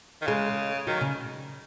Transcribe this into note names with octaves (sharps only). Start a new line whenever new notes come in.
D#3
C#3 G#3
D#3 F#3
C#3